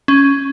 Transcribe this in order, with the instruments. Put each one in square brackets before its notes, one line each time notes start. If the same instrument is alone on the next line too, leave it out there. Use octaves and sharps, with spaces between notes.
[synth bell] C#4